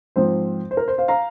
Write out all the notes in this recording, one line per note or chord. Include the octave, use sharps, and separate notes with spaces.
G#2 F3 C4 C5
C5
A#4
C5
C5 F5
F5 A#5